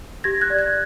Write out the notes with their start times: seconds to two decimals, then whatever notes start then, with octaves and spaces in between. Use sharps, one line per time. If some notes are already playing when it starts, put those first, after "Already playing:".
0.24 G4 G#6 A#6
0.41 F#6 G#6
0.50 D5
0.58 F#6 G#6